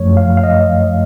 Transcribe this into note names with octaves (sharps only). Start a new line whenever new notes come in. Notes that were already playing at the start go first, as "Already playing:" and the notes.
Already playing: F#2 F3 A3 C#5
F5
F5
D#5